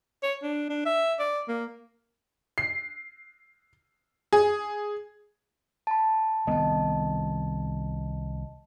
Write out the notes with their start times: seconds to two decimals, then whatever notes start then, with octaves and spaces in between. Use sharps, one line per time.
0.23 C#5
0.42 D4
0.69 D4
0.86 E5
1.19 D5
1.48 A#3
2.58 C7
4.33 G#4
5.87 A5 B5
6.47 C2 D#3 B3 D#5 A5